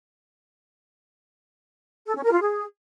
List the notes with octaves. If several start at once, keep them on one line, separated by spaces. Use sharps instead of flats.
A4
C#4
A#4
F4
G#4